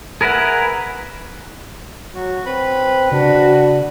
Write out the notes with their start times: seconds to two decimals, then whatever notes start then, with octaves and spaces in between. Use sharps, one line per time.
0.21 G#4 A#4 B4 E5 F#5
2.15 F#3 F#4
2.46 C4 B4 B5
3.12 C#3 D4 F#4